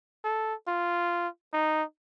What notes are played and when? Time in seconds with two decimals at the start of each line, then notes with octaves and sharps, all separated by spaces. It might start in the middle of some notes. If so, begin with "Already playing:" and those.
0.24 A4
0.68 F4
1.53 D#4